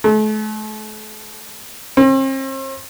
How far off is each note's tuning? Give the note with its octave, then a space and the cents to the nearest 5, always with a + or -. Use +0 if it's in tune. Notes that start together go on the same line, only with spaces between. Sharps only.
A3 -40
C4 +40